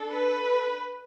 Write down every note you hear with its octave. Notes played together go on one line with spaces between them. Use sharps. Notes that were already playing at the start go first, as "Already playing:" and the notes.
Already playing: D4 A4
B4